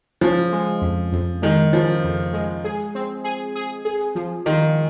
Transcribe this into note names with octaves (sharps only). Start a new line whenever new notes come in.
C#3 F3
G#3
F2
F2
D#3 G#3
C#3 F3
F2
G#3
G#4
C4
G#4
G#4
G#4
F3
D#3 F4